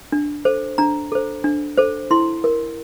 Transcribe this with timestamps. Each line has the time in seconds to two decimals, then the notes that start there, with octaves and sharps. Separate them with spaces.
0.12 D4
0.45 A4 C5
0.78 D4 A#5
1.12 A4 C5
1.44 D4
1.77 A4 C5
2.11 E4 C6
2.44 A#4